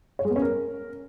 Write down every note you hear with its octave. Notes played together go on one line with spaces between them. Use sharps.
C#5
G#3
B3
C#4
A#4